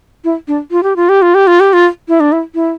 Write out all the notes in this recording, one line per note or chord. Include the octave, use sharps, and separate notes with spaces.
E4
D4
F4
G4
F4
G4
F4
G4
F4
G4
F4
E4
D4
E4
E4